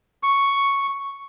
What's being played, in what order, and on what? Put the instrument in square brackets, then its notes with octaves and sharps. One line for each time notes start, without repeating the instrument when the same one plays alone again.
[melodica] C#6